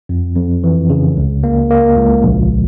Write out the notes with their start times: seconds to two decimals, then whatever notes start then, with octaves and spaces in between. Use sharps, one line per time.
0.09 F2
0.36 F2
0.64 E3
0.90 C#3
1.16 C#2
1.43 A#3
1.70 A#3
1.97 C#2
2.23 A#1